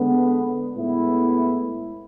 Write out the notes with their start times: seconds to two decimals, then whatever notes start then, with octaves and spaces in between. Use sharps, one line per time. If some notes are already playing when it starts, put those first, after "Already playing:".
Already playing: D3 G#3 B3
0.76 A2 G#3 B3 E4